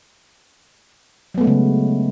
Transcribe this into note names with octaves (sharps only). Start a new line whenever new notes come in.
C#3 F#3 G#3 A3 B3